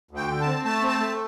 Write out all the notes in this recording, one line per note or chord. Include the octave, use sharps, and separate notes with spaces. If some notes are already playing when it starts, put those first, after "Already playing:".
D2
G5
D3
A5
C4
A3 A5
C4
A5
A3